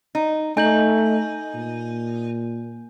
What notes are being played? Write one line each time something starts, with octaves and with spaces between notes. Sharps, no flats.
D#4
A3 D#4 G#5 G6 F#7
A#2